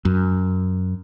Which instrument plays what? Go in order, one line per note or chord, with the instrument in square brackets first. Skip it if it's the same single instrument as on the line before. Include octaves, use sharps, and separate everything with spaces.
[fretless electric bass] F#2